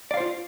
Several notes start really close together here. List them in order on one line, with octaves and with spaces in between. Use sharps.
D5 F5 C5 F4